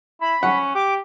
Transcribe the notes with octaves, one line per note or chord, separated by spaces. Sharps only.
E4 B5
C#4 F#5
G4 D6